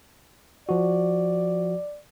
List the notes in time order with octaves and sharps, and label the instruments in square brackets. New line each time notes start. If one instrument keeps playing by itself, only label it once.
[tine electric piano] F3 F#4 [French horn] D5